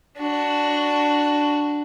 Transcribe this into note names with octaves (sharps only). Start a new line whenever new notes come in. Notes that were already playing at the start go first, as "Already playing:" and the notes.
D4 F#4